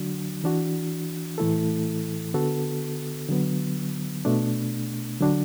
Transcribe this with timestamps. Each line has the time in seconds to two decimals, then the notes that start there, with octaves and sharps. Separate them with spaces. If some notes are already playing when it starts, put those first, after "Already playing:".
Already playing: D3 F#3 D4 F#4
0.44 E3 D4 F#4
1.38 A2 E3 A3 E4 A4
2.34 D3 B3 F#4 A4
3.29 D3 F#3 B3
4.25 B2 A3 D4
5.21 D3 F#3 D4 F#4